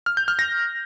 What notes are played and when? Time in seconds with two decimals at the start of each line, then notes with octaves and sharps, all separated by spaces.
0.06 F6
0.17 G6
0.28 F6
0.39 A#6